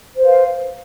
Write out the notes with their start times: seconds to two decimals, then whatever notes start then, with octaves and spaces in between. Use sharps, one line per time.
0.17 C5
0.21 B4
0.25 F5